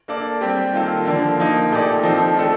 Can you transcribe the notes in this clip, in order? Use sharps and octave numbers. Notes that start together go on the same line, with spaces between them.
A#3 D4 A4 D5
G3 C4 G4
D#3 A#3 F4 A4
D3 F3 A#3 D4
F3 A#3 D#4
A#2 A3 D#4 G4 D5
F3 C4 D#4 A4
D#3 A3 D4 A4